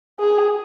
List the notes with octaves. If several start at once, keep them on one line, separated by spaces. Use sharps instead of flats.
G#4